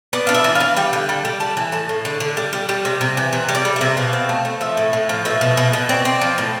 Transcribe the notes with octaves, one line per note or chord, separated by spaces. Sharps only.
B3 D5
D4 F5
E5
E3
F5
E3
G3 G5
D3
G3
G3
G3 A5
E3
A2 A5
A2
D3
D3
G3
G3
G3
C3
C3
E3
C3
G3
D5
G3
E5
C3
B2 F5
C4
A3
A3
F3 E5
A2
A2
F3
B2 E5
B2
B2
B2
C4 D5
C4
F3
A2